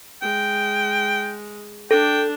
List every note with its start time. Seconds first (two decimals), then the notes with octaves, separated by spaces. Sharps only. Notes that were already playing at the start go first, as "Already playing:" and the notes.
0.22 G#3 G5
1.91 D4 A4 G5